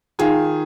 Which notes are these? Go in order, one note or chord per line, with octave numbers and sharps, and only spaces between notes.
D#3 F4 G#4